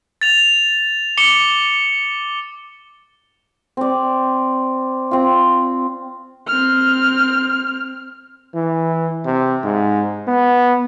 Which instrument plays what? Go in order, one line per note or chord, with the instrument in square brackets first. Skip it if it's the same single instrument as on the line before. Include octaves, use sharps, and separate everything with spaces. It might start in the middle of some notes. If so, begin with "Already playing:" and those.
[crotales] A6 F7
D6 C#7 G7
[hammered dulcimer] C4 D5
C4 F4
[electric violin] C4 F6
[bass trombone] E3
C3
G#2
B3